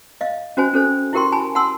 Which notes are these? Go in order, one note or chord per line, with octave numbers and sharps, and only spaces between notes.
D#5 F5
C#4 F#4 C5 G#5
C#4 A4 C5
E4 F#4 G4 A#4 G5 C6
G#5 A5 B5
F#5 A5 C6 E6